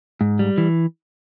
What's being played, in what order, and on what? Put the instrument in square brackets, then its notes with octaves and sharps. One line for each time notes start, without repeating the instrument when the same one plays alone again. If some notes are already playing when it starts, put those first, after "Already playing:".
[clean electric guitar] G#2
G3
E3